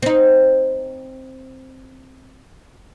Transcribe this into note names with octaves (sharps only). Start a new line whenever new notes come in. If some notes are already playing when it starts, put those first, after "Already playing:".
C4 D#4